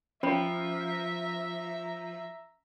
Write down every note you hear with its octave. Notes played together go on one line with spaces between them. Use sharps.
F3 C#4 C5 E5 A#5 B5